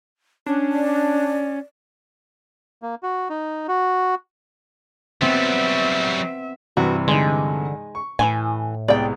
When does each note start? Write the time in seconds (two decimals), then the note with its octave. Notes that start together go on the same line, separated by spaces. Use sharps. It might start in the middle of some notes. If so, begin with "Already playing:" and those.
0.46 C#4 D4
0.72 D5
2.82 A#3
3.03 F#4
3.30 D#4
3.68 F#4
5.21 F#3 G3 B3 C4 E5
6.77 G2 C3 E3 F#4
7.08 D3 G#3 D#4
7.95 C#6
8.19 A2 E3 F4 G#5
8.88 C2 G#3 B3 D5 G5